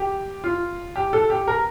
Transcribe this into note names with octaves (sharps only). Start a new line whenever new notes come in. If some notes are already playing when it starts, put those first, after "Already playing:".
Already playing: G4
F4
G4
A4
G4
A#4